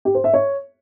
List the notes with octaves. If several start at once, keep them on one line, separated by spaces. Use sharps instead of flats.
G4
C5
E5
C#5